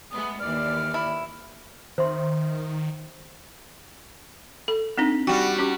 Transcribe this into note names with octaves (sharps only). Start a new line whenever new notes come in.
G#3 A3 B3 D#6
D#2 E3 D5 F6
E4
D#3 C5 E5 C6
A4
C4 D4 D#4
G3 F#4 G5
C#4 G4